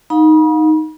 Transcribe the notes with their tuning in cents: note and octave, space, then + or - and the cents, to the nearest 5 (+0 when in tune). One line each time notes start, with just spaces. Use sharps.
D#4 +0 F5 +40 B5 -40